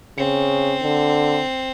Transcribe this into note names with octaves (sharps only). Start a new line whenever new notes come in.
C#3 C4
D3